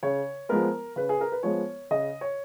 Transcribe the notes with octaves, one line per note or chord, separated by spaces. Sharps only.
C#3 C#5
F3 G#3 B3 A#4
C#3 B4
G#4
A#4
B4
F3 G#3 B3 C#5
C#3 D#5
C#5